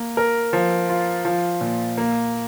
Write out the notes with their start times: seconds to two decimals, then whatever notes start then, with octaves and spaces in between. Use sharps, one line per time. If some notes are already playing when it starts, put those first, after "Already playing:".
Already playing: A#3
0.17 A#4
0.53 F3
0.89 F4
1.25 F3
1.61 A#2
1.97 A#3